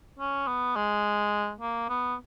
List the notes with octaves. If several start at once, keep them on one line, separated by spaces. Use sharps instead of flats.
C#4
B3
G#3
A#3
B3